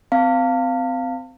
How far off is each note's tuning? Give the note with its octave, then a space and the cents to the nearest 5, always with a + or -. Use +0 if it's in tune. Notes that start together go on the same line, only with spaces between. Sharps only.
C4 -25 F5 +0 A5 +40